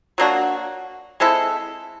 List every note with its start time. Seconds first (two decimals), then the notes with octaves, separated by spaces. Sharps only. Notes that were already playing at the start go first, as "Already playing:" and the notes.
0.18 F#3 A#3 D4 F#4
1.20 G#3 C4 E4 A4